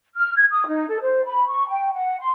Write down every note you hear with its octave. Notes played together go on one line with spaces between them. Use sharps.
F6
G#6
D#6
D#4
A4
C5
B5
C#6
G5
F#5
C6